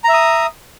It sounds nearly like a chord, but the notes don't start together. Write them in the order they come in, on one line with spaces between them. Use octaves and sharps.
A#5 E5 D#6